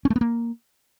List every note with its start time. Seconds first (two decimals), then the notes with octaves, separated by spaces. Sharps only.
0.05 C#4
0.10 A3
0.16 B3
0.21 A#3